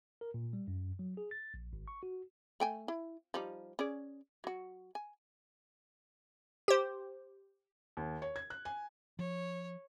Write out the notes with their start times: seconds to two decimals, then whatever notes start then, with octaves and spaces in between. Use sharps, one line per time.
0.21 A#4
0.34 A#2
0.53 G3
0.68 F#2
0.99 F#3
1.17 G#4
1.31 A6
1.54 A#1
1.73 G#1
1.88 C#6
2.03 F#4
2.60 A3 G5 G#5
2.88 E4
3.34 F3 G3 D#4
3.79 C#4 G#4 D5
4.44 F#3 F#4
4.95 G#5
6.68 G4 C5
7.97 D#2
8.22 C#5
8.36 G#6
8.50 F#6
8.65 G#5
9.19 F3 C#5